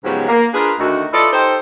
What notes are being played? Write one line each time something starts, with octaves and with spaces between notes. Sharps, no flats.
G#2 C#3 F3 F#3 B3 G4
A#3
D4 F4 G#4 A#4 B4
D2 D#3 F#4
E4 F4 A4 B4 D5 D#5
D#4 G4 A4 C5